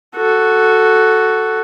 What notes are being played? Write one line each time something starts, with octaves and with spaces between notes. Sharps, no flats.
F#4 A4